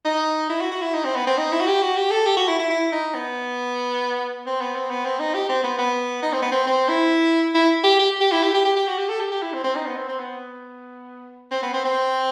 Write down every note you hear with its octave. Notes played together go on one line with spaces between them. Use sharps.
D#4
E4
F#4
F#4
E4
D#4
C4
B3
C4
D#4
E4
F#4
G4
F#4
G4
A4
G4
F#4
E4
E4
E4
D#4
B3
C4
B3
C4
B3
C4
D#4
G4
C4
B3
B3
D#4
C4
B3
C4
C4
E4
E4
G4
G4
G4
E4
G4
G4
G4
G4
F#4
G4
A4
G4
G4
E4
C4
C4
D#4
B3
C4
C4
B3
C4
B3
C4
C4